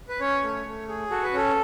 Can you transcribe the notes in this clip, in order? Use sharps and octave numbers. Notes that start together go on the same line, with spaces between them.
B4
C#4 C#5
A3
A3
G#4
F#4 A4
B4
C#4 A4